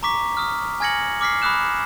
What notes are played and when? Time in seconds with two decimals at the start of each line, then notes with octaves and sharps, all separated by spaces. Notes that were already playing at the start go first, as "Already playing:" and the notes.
0.03 A#5 C#6 D6 B6
0.37 D#6 F6
0.80 G#5 F6 G#6 A#6 C#7 F#7
1.21 D6 F6 B6 C7
1.42 B5 D6 D#6 F#6 E7